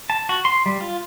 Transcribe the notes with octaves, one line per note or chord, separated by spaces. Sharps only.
A5
F#4
C6
G3
F4